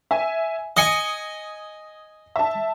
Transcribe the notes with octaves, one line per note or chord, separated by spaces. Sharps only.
E5 G#5
D#5 G#5 D#6 C#7
E5 A5